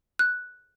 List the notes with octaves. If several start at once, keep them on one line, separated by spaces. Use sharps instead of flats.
F#6